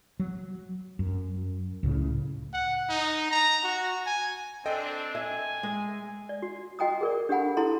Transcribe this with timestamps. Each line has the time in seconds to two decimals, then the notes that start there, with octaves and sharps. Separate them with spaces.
0.20 F#3
0.99 F#2
1.83 C#2 A2 C#3
2.53 F#5
2.89 D#4
3.31 A#5
3.63 F#4
4.06 G#5
4.66 C4 D4 A4 D#5 G5
5.15 E5 G#5
5.63 G#3
6.29 D5
6.42 F#4
6.79 F#4 D#5 G5 G#5 A#5 D#6
7.01 G#4 A#4 D5
7.29 D4 G4 A4 F#5 G#5 B5
7.57 E4 A4 A5 A#5 C6